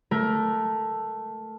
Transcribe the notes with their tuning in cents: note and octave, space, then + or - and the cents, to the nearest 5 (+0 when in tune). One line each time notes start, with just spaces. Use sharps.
A3 +0 A#4 +20